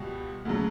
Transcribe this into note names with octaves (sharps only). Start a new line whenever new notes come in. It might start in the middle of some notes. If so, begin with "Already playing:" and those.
Already playing: C#2 B2 G3
D2 C#3 F#3